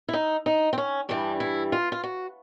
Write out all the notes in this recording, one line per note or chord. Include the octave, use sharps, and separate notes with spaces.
E4
D#4
D#4
C4
C#4
G2 E3 G3 D4
E4
F4
F4
F#4